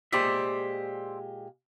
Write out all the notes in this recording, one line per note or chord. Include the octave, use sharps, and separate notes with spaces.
A#2 G#3 G4 C5 D5 E5